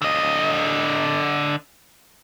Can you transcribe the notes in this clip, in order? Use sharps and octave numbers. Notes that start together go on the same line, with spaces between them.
D3 D#5